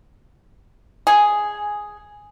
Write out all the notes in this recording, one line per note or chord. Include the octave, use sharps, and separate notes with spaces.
G#4